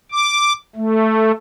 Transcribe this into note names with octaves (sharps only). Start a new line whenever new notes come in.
D6
A3